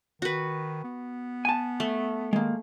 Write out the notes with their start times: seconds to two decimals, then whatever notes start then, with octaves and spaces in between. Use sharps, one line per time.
0.22 D#3 F#4 B4
0.84 B3
1.45 G#5 A5
1.80 A3
2.33 D#3 G#3 A#3